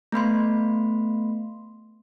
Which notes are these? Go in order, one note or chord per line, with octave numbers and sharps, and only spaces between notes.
A3 B3 B5 C6